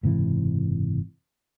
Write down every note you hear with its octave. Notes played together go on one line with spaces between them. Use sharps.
F#1 G#2 C3 E3